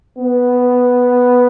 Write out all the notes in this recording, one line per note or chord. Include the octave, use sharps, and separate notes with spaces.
B3